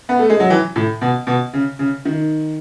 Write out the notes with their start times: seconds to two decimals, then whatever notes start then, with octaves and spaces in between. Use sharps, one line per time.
0.09 B3
0.19 A3
0.30 G#3
0.40 F#3
0.50 E3
0.76 A2
1.01 B2
1.27 B2
1.53 C#3
1.79 C#3
2.05 D#3